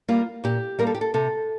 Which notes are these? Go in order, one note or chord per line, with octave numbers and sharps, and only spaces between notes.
G3 A#3 F4
A#2 G4
G3 A#3 A#4
A4
G4
A4
C3 A4